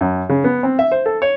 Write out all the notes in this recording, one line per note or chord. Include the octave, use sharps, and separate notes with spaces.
F#2
C#3
B3
C4
E5
C5
A4
C#5